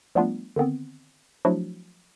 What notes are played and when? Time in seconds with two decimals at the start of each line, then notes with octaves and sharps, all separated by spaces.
0.15 F3 G3 A3 B3 D4 F4
0.56 D3 D#3 B3 C4
1.45 F3 F#3 A3 D4 E4 F#4